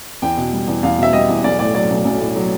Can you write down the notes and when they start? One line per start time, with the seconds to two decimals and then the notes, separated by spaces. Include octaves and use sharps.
0.22 E2 G5
0.37 B2
0.53 G3
0.67 E2
0.83 E2 F5
0.98 B2 E5
1.13 G3 D#5
1.29 E2
1.44 B1 D5
1.59 A2 D5
1.75 F#3 D5
1.90 B1
2.05 B1
2.20 A2
2.35 F#3